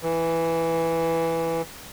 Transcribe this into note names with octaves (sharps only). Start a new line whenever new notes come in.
E3